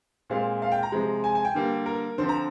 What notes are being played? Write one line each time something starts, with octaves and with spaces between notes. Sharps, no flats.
A#2 G#3 C4 F5
F5
G5
A#5
C3 F3 G#3
G#5
G#5
G5
D3 G3 A#3
A#4
D3 F3 C4 C5
A#5